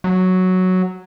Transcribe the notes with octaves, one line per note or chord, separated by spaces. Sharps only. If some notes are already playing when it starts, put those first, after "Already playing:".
F#3